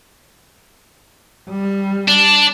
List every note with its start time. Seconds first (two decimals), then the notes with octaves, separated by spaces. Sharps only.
1.50 G3
2.08 D4